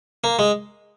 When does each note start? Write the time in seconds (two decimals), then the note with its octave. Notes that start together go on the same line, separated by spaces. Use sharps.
0.24 A#3
0.39 G#3